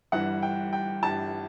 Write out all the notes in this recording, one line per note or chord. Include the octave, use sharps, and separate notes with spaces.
G1 G2 E3 G3 F#5
G5
G5
G1 G2 E3 G3 A5